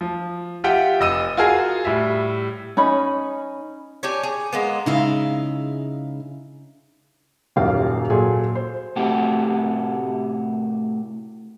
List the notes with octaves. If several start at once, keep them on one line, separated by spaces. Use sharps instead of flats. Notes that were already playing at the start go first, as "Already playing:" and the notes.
F3
F4 G4 E5 F#5 G5
F1 D#5 E6 D#7
F4 F#4 G#4 A#4 F5 G#5
A2 G3 E5
C#4 D#4 B5
D4 G4 C#5 G#5
G#4
G#3 A#3 B3
C#3 G#3 D#4 E4 E5 F5
D#1 F#2 G4 F5
A#2 F#3 G#4 A4
C5
A2 C3 A3 F#4 G4